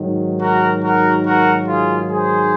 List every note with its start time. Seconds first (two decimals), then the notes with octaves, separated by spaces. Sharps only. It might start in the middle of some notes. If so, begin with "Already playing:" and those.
Already playing: G#2 D#3 F#3
0.40 F#4 A#4
0.82 F#4 A#4
1.25 F#4 A#4
1.67 F4 G#4
2.10 G#4 C5